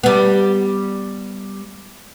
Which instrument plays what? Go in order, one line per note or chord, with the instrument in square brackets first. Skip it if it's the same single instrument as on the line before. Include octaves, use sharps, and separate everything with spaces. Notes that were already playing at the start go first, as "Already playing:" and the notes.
[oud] G3 B3